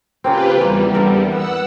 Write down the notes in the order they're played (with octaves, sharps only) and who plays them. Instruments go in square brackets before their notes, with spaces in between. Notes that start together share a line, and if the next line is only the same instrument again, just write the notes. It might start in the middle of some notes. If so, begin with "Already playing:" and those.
[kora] C#3 A#3 C4 [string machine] F4 G4 B4
[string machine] E2 G3 [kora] E3 A#3
[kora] D3 A#4 E5
[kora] B3 [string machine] F#5 E6